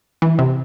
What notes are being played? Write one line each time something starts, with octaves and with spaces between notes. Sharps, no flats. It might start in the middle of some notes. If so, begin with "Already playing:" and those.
E3
C3